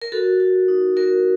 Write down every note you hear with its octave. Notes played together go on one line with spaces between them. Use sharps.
A#4
F#4 A4
F#4
D#4
F#4 A#4